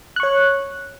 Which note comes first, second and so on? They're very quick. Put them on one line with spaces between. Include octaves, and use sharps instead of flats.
F#6 C#6 C#5